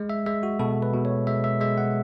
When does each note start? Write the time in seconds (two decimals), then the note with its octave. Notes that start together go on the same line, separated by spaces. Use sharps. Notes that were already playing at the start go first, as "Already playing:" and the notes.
Already playing: G#3
0.10 E5
0.26 G#3 E5
0.43 F#4
0.59 B2 A4
0.82 B4
0.94 B2
1.05 C#5
1.27 G#3 E5
1.44 E5
1.61 G#3 E5
1.78 F#5